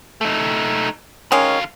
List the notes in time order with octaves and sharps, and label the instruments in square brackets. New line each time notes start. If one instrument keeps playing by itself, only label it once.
[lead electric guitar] A3 D#4
[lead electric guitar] D3 F5 [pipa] D#3 G#3 C#4